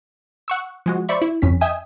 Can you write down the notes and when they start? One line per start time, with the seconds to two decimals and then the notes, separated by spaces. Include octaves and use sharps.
0.48 F#5 C#6 E6
0.86 F3 G#3 F#4
1.09 C5 D5 E5 B5 C#6
1.22 E4
1.42 G1 F2 C#4 B6
1.61 D#5 E5 G5 G#5 D#6